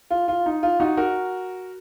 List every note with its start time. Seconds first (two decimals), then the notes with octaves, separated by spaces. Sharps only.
0.10 F4
0.28 F4
0.46 D#4
0.63 F4
0.80 D#4 F#4
0.97 F#4 A#4